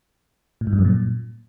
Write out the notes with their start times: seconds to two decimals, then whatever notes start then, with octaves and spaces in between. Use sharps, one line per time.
0.61 A2
0.67 G#2
0.73 G2
0.79 F#2
0.85 A#2